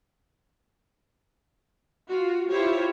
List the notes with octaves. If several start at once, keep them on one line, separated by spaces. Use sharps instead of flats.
F4 F#4
E4 F4 G4 C5 C#5